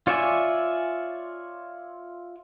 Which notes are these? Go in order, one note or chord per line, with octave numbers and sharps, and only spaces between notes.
F4 C#5 D5 E5 G#5